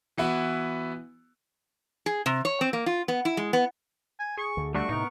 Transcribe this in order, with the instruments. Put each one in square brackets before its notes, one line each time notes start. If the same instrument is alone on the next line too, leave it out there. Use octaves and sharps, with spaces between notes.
[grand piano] E3 B3 E4 F#4
[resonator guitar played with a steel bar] G#4
C3
C#5
C4
A#3
F4
B3
E4
G#3
B3
[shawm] G#5
[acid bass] G#4 [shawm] C#6
[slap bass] D2 D3
[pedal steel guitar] G3 D4 F#4 [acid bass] A3 [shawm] C#6
[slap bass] A2 C3 [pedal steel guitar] B3 A#4 [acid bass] D#4